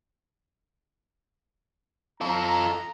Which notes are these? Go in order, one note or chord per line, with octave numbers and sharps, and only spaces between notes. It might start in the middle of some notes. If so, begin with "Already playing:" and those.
F4 A4 A#5